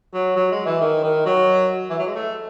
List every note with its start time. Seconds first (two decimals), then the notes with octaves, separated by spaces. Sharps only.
0.14 F#3
0.36 F#3
0.52 G#3
0.66 E3
0.81 D#3
1.03 D#3
1.26 F#3
1.90 E3
1.99 F#3
2.07 G#3
2.15 A3